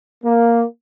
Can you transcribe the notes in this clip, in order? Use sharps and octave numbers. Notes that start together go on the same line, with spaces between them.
A#3